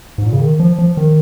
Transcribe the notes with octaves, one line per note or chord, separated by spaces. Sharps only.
G#2
A#2
C#3
D#3
F3
F3
D#3